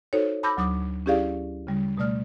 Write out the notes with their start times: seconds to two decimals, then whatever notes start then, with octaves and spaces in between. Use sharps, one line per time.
0.13 D#4 F#4 A4 C5 C#5
0.43 A5 B5 D6 E6 G6 A#6
0.57 D2 F#3 D6 D#6
1.06 C#4 E4 G4 G#4 D5 F5
1.67 C#3 G3
1.97 B2 G3 A3 D5 F6